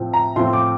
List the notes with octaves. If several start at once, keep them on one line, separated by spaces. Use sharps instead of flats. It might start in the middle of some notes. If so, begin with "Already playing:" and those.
Already playing: A2 F3 C4
A#5
A2 F3 C4 C6
D6